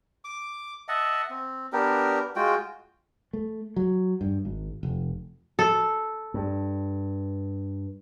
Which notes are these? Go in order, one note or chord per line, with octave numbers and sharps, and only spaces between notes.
D6
D#5 E5 F#5 A5
C4
B3 D4 G4 A#4
G#3 F4 F#4 G5
A3
F#3
G2
G#1
F1
A4
G2